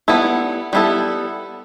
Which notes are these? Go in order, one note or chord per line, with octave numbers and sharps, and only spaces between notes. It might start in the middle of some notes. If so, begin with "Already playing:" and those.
G3 B3 E4 A4
G3 B3 E4 A4